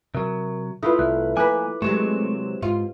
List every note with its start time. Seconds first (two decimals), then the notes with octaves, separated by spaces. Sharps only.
0.15 C3 F#3 A#4
0.83 A3 E4 F4 B4 D#6
0.99 C2 F#6
1.37 F3 A#3 B4 G#5 D6 F#6
1.82 C3 F#3 G#3 A3 E7
2.62 G#2 F4